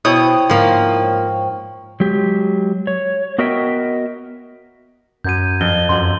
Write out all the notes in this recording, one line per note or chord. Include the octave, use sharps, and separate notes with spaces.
B2 E4 C5 C#5 G5 C#6 D#6
G#2 F3 A#3
F#3 G#3 G4
C#5
B3 F#4 A#4 D#5 E5 G5
F#2 G6 G#6 D#7
F2 G7
F#2 C6 G6 F#7